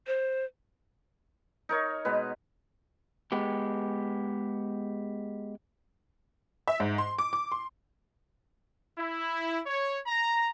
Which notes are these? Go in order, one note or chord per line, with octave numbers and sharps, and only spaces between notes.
C5
D#4 A#4 C#5
B2 G#3 B4
G#3 B3 G4
E5
G#2
C6
D6
D6
C6
E4
C#5
A#5